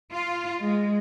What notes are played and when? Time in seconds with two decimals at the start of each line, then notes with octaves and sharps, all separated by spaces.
0.10 F4
0.61 G#3